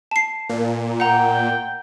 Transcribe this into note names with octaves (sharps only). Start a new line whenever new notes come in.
A5 C7
A#2
F#5 G5 A#5